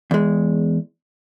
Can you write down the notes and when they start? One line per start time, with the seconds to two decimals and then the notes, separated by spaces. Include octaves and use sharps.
0.11 E2 G#3